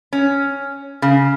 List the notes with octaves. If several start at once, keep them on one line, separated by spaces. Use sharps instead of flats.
C#4
C#3